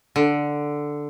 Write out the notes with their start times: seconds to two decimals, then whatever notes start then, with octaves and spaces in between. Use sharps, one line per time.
0.16 D3